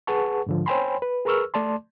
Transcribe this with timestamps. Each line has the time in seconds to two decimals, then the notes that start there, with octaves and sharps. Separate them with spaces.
0.07 G#4 B4 F#5 A5 C#6
0.46 G#2 D3 F3
0.66 C5 C#5 G5 G#5 B5 C6
1.02 B4
1.25 G#4 A#4 B4 C#6 E6 F6
1.54 A3 D5 A5 C6